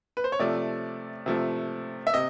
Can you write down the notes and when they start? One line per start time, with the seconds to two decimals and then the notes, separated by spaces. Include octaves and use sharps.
0.17 B4
0.24 C5
0.32 C#5
0.39 C3 F3 A3 D5
1.26 C3 F3 A3
2.07 E5
2.14 C3 D#5